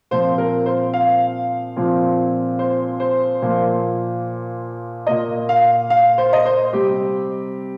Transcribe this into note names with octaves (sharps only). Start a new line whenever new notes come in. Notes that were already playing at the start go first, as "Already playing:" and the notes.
A#2 F3 C4 C5
A#4
C5
F5
A#2 F3 C4
C5
C5
A#2 F3 A#3
A#2 A#3 D#5
F5
F5
C5
D#5
C5
C3 G3 C4 G4